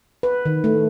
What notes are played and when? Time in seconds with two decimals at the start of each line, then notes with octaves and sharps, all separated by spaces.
0.23 B4
0.45 D#3
0.64 A3